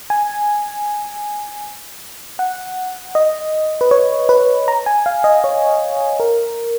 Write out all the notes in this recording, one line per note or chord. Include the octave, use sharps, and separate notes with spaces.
G#5
F#5
D#5
B4
C#5
B4
A#5
G#5
F5
D#5
C#5
A#4